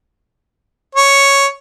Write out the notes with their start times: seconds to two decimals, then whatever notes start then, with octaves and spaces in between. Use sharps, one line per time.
0.95 C#5